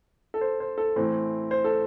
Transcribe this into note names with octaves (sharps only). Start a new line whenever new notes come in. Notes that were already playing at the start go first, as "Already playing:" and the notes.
A4
C5
C5
A4
A2 E3 C4
C5
A4